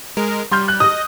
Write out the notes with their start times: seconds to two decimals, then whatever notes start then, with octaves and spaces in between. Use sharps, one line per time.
0.17 G#3 A#4
0.51 G3 C6 F6 G6
0.68 F#6
0.80 D#5 D#6